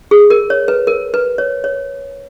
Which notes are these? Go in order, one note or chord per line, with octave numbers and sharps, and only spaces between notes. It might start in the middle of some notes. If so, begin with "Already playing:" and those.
G#4
A#4
C#5
B4
A#4
B4
C#5
C#5